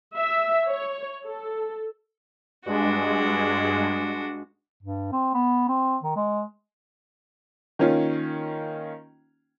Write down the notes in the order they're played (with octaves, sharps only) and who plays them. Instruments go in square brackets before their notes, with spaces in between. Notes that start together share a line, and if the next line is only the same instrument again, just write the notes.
[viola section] E5
C#5
A4
[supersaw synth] G2 G#3 [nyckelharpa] D4 F#4
[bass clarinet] G2
C4
B3
C4
D#3
G#3
[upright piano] D#3 A#3 C#4 F4